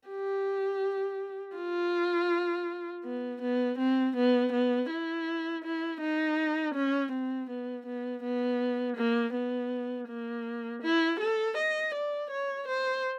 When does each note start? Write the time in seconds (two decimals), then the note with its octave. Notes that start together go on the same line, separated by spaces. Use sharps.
0.08 G4
1.56 F4
3.04 B3
3.42 B3
3.79 C4
4.16 B3
4.52 B3
4.90 E4
5.64 E4
6.01 D#4
6.75 C#4
7.12 C4
7.50 B3
7.86 B3
8.23 B3
8.97 A#3
9.34 B3
10.08 A#3
10.82 E4
11.20 A4
11.57 D#5
11.94 D5
12.31 C#5
12.68 C5